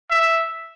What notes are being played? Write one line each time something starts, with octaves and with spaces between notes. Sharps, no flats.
E5